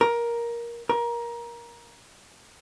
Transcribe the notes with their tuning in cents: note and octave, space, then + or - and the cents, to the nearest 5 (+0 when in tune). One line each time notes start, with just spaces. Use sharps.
A#4 +15
A#4 +20